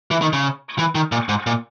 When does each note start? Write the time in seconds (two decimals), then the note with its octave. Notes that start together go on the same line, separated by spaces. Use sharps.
0.11 E3
0.22 D#3
0.33 C#3
0.78 E3
0.95 D#3
1.12 A#2
1.29 G#2
1.46 A#2